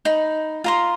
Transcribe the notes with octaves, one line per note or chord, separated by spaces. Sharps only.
D#4 B5
F4 A#5 C6